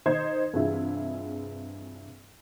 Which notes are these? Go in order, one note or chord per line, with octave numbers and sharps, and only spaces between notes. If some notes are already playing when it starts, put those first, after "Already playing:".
D#3 D#4 C5 G#6
G2 C3 E3 G#3 E4 F4